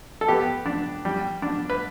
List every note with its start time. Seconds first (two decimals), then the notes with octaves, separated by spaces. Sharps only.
0.21 A4
0.28 B3 G4
0.66 D4
1.05 G3
1.42 D4
1.70 B4